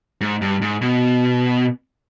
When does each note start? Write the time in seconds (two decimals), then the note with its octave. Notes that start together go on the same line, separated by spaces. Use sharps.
0.21 G#2
0.42 G2
0.61 G#2
0.81 B2